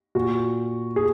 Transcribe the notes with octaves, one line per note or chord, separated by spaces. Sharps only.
A#2 F#4
G#4